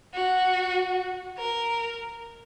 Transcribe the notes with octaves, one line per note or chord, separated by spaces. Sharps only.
F#4
A#4